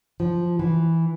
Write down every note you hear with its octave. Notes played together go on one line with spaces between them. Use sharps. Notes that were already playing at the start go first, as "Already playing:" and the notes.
F3
E3